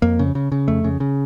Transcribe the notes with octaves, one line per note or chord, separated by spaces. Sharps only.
F2 A#3
C#3
C#3
C#3
F2 A3
C#3
C#3